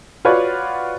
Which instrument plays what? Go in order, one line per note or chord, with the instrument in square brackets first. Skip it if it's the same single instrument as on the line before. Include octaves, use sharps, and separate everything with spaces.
[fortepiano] F4 F#4 B4 C#5 D5 F#5